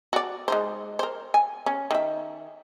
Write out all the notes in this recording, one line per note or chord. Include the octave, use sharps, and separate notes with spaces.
F#4 D5
G#3 D#4 C5
A#4 C5
G#5
C#4
D#3 E5